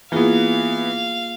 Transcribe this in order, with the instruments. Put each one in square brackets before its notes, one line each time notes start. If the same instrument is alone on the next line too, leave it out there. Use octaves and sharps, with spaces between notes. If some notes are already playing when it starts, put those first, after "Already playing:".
[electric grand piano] E3 B3 [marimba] A#3 F4 G#4 [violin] F5